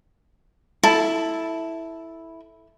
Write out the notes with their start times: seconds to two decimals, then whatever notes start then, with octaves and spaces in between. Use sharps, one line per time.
0.83 E4 A4 A5